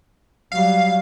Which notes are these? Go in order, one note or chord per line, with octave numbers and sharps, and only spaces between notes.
F#3 G3 F5